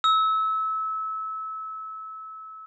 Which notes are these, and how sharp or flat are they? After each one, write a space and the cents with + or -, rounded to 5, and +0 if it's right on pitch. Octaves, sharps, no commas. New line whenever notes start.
E6 -25